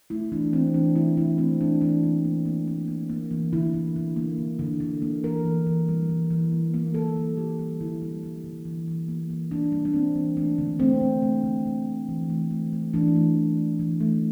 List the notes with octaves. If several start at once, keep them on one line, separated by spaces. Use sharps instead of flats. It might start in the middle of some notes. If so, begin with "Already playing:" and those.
A3 E4
E3 D4
E3 C4
E3 D4
A3 E4
E3 E4
A3 C4
E3 D4
E3 D4
A#3
E3
A#3
A#3
A#3
A#3
E3
D3 E4
D3
D3
A#3
D3
D3
D3
A#3
E3 A#4
E3
E3
G3
E3
E3
A#3
A#3
D3 A4
G3
A#3 G4
G3
D3 E4
G3
G3
D3
E3
E3
A#3
E3
A#3 D4
G3
D4
A#3 C4
E3
A3 D4
D3
A3 C4
D3
A3
D3
D3
A3
E3
A3
A3
A3
E3 D4
A3
E3
A3
E3
A3